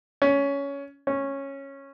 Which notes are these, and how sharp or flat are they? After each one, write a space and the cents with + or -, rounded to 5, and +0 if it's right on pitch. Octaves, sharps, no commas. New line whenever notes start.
C#4 +15
C#4 -10